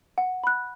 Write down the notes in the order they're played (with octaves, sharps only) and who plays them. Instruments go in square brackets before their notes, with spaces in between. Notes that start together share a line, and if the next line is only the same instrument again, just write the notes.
[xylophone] F#5
B5 F#6